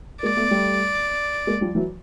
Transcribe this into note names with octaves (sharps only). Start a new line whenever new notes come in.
G#3 A#3 D5
A3 B3
G3 A3
G#3 A#3
F3 G3
E3 F#3